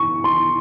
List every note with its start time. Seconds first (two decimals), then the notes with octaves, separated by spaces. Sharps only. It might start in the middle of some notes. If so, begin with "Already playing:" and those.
Already playing: C#6
0.24 C6